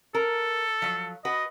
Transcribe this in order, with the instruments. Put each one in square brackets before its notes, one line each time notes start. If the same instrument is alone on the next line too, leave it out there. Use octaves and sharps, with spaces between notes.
[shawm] A4 [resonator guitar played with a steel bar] A#4
[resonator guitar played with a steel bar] F3 F#3
[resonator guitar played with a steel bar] F#4 B4 [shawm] D#5